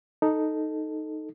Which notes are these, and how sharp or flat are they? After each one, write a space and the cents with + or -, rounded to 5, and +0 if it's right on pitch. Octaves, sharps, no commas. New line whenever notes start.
D#4 +0 A4 +0